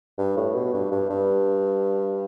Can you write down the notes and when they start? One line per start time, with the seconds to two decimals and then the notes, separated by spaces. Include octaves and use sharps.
0.18 G2
0.37 A2
0.55 B2
0.74 G2
0.92 G2
1.10 G2